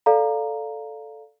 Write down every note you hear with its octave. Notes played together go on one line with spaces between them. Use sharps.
A4 D5 F5 A#5